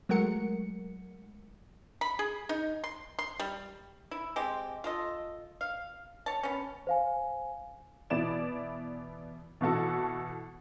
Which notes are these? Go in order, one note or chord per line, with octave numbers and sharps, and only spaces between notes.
F#3 G#3 A3 A#4 F#5 C#7
B5
G#4
D#4
C6
C6
G3
E4
G#3 C4 G4
F4 A4 D#5
F5
C#5 A5
B3 C#4
C5 F5 G#5
B2 E3 B3 E4 D5 E7
B2 E3 F#4 A4